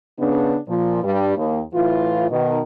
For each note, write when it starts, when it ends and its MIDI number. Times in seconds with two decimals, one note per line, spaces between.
0.20 0.58 49
0.20 0.58 59
0.20 0.58 62
0.68 1.03 46
0.68 1.03 53
1.04 1.36 43
1.04 1.36 55
1.37 1.61 39
1.74 2.27 45
1.74 2.27 52
1.74 2.27 65
2.31 2.61 47
2.31 2.61 51